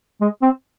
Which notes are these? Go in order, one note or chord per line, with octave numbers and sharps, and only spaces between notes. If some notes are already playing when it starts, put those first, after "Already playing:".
G#3
C4